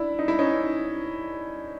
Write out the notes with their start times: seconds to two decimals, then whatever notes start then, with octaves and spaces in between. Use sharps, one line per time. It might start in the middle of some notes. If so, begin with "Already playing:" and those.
Already playing: D4 E4
0.19 D#4
0.28 E4
0.39 C#4 D#4